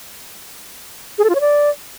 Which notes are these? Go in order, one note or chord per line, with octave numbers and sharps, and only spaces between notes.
G#4
A4
F4
C#5
D5